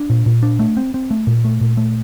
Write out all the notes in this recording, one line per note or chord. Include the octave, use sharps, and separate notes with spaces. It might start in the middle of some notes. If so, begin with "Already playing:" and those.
Already playing: D4
A#2
A#2
D4
A3
C4
C4
A3
A#2
A3
A#2
A3